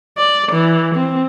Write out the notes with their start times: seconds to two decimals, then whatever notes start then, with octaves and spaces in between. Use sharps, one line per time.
0.18 D5
0.52 E3
0.95 C4